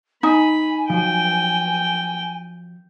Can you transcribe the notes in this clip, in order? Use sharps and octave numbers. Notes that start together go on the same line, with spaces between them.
D#4 G#5 B5
F3 F#3 G5